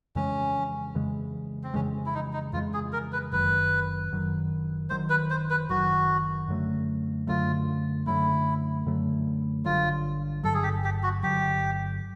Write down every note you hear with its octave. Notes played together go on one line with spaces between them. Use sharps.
F2 C#3 E3 G#3 C#4
F2 C#3 E3 G#3
C4
F2 C#3 E3 G#3 C#4
E4
D#4
D#4
F2 C#3 E3 G#3 F4
G#4
A#4
B4
F#1 F#2 D#3 F#3 B4
F#1 F#2 D#3 F#3
F#1 F#2 D#3 F#3 C5
B4
C5
B4
F#1 F#2 D#3 F#3 F#4
F#2 D3 F#3 A3
F#2 D3 F#3 A3 F4
F#2 D3 F#3 A3 E4
F#2 D3 F#3 A3
G1 G2 D3 F#3 F4
G1 G2 D3 F#3 A4
G#4
G4
G4
F#4
G1 G2 D3 F#3 G4